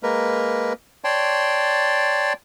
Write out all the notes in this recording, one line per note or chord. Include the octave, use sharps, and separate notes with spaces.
G#3 A#3 A#4 B4
C#5 D5 G5 A5 C6